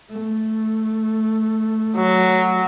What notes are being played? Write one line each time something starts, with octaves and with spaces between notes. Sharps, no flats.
A3
F#3